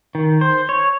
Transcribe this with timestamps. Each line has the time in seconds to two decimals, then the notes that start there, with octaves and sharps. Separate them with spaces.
0.15 D#3
0.41 C5
0.69 C#5